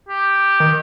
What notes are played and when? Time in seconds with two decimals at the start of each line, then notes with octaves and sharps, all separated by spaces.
0.09 G4
0.60 D#3